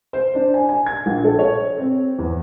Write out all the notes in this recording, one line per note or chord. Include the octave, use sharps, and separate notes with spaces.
C5
D4
G#5
G#5
G#6
A#1
A4
C#5
C4
E2